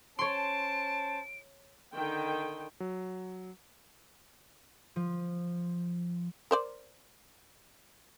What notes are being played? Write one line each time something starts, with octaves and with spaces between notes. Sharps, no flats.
C#4 C5 C#5 A5 C6 D7
D3 D#3 G5
F#3
F3
A#4 C5 D5